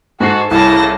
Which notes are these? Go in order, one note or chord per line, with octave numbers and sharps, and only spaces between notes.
G#2 F#4 A4 C7
C2 A2 C#3 A#3 E4 A5 A#6